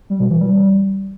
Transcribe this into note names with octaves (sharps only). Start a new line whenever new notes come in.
G3
B2
E3
G3